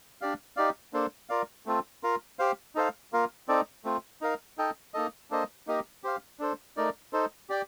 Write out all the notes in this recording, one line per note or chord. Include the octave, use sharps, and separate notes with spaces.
D4 G4 D5 F5
D#4 G4 D5 F5
A#3 D4 A4 C5
F4 A#4 D5 F5
A3 C4 F4 A4
F4 A#4 F5
G4 C5 F5
D#4 A4 C5 F5
A#3 F4 A#4 F5
C4 D#4 A4 D5
A3 C4 F4
D#4 A#4 F5
D#4 A4 D#5 G5
A#3 D#4 A4 D#5
A#3 D4 A4 C5 D#5
A#3 D#4 G4 A#4 D#5
G4 C5 F5
D4 A4 C5
A3 D#4 A#4 D5
D#4 A4 C5
G4 D5 G5